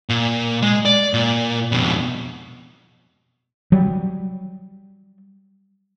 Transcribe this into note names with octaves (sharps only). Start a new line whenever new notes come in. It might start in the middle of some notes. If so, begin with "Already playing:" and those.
A#2
G#3
D5
A#2
F2 B2
F#3 G3